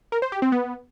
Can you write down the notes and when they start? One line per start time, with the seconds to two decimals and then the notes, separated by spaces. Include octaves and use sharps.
0.12 A#4
0.22 C5
0.32 G4
0.42 C4
0.52 B3